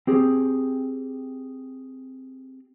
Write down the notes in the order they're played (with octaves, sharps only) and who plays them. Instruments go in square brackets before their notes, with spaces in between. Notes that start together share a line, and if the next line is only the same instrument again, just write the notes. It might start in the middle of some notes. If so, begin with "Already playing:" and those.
[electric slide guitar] C4 G4 G#4